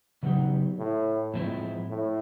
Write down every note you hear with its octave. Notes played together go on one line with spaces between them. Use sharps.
C#3 F#3 B3 D#4 G4
A2
A2 F3 G#3 C4 E4
A2